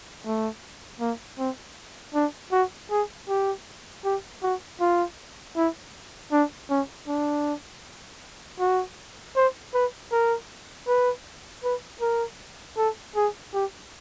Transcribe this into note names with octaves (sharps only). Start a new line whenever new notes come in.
A3
A#3
C4
D4
F#4
G#4
G4
G4
F#4
F4
E4
D4
C#4
D4
F#4
C5
B4
A#4
B4
B4
A#4
A4
G#4
G4